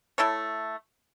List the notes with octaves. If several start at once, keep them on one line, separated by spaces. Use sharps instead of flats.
A3 E4 A4 C#5